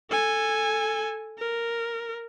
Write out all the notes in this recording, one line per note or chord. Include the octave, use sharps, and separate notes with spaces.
A4 G#5
A#4